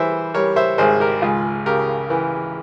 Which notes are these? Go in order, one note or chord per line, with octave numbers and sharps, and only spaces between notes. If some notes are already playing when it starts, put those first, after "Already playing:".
Already playing: E3 G3 C5 E5
G3 A#4 C#5
C5 E5
G#1 G#4 C5
G4 A#4
C#2 F4 G#4
C#3 G4 A#4
E3